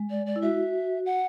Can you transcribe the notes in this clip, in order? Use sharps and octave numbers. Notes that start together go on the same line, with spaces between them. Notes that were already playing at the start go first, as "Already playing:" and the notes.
Already playing: G#3
D5
D5
E4
F#4 E5
F#5